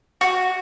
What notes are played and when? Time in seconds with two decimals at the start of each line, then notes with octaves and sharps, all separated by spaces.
0.21 F#4